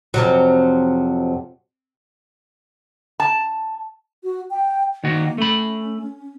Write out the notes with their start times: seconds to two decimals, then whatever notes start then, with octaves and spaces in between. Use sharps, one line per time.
0.14 F2 C3 F#3
3.20 A5
4.24 F#4
4.51 G5
5.04 D#3 A#3 F#4
5.38 A3 C#4 B5